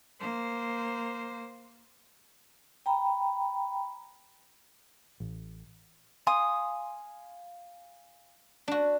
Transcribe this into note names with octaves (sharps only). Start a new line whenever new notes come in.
A#3 C5
G5 A#5 B5
A1
F5 G#5 C6 D#6
D4 F#4